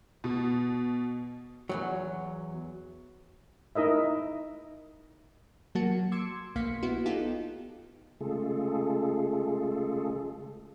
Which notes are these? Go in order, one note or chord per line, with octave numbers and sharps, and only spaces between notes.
B2
E2 G2 F#3
D#4 E4 A#4 D#5 E5
F#3 A#3 F#4 A5 C#7
C6 D6 E6 G#6 C#7
B1 A#3 F5 C6 B6 C#7
B3 E4 F#4
B3 D#4 F4 G4 A4
C#3 G#3 A3 F4 G#4 A4